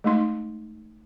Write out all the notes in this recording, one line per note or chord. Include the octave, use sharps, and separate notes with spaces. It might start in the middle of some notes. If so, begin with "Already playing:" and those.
G#3 A3 D#4 C6